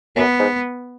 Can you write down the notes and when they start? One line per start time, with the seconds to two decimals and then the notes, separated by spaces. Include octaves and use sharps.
0.16 F#2 B3
0.39 G#2